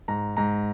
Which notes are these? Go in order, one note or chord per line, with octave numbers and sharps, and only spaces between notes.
G#2 A#5
G#2 A#5